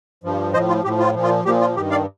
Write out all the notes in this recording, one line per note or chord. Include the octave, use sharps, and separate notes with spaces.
G2 F3
A2 F3 C5 D#5
F4
A2 F3 G4
F4
A#2 F3
F4
A#2 F3 G4
F4
G2 D#3 G4
D5 F5